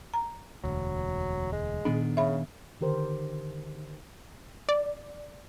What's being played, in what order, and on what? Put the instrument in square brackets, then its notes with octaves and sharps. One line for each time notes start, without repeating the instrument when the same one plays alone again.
[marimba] A#5
[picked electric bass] E1 D2 [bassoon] F#3
[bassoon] G#3
[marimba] A#2 [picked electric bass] D#3 B3 D4
[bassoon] C#3 [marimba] E5 B5
[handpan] D3 D#3 G4 A#4 C5
[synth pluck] D5